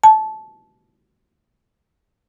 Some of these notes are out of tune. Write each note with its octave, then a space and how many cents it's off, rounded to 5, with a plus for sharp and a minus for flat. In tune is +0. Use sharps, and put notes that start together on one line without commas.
A5 -20